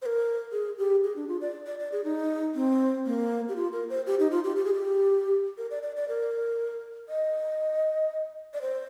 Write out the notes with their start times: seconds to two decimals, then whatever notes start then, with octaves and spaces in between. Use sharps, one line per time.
0.02 C5
0.06 A#4
0.52 G#4
0.78 G4
1.04 G#4
1.16 D4
1.28 F4
1.41 D5
1.66 D5
1.79 D5
1.92 G#4
2.04 D#4
2.55 C4
3.06 A#3
3.49 G4
3.56 F4
3.72 A#4
3.90 C5
4.07 G4
4.19 D#4
4.31 F4
4.44 G4
4.56 G4
4.65 G#4
4.73 G4
5.58 A#4
5.71 D5
5.83 D5
5.96 D5
6.08 A#4
7.09 D#5
8.54 D5
8.62 C5